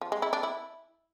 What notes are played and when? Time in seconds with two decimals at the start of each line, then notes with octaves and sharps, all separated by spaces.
0.01 F3
0.12 G#3
0.22 E4
0.33 D4
0.43 E4